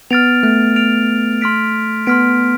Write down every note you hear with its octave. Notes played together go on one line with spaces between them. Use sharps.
B3 F6 A6 D7 F7
A3
F6 A6 D7 F7
C6 F6 B6 D7
B3 C6 F6 B6 D7